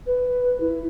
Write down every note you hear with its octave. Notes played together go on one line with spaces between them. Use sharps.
B4
E4